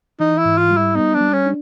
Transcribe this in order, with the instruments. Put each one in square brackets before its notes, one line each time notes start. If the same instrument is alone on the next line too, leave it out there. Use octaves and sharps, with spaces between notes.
[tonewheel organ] E3 [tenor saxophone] D#4
[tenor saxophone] E4
[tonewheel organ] G#2
[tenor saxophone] F4
[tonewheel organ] G3
[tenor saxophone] E4
[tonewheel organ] B3 [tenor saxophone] D#4
[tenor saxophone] D4
[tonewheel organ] G3
[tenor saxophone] C#4
[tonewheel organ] D4